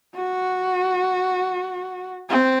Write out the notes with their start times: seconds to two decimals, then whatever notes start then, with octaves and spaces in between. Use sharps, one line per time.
0.16 F#4
2.29 C4